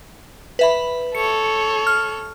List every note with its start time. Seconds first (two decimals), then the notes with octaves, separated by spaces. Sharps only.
0.59 B4 E5 B5
1.15 A4 C#5 C#7
1.87 F6